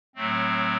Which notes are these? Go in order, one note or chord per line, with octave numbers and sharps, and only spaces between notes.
A2 F#3 A3 C4